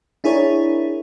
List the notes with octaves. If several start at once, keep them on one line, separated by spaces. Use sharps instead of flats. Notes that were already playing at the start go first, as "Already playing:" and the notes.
D4 E4 G#4 A#4 C#5